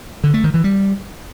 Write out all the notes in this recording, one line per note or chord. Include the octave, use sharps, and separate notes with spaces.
D3
A3
D#3
E3
G3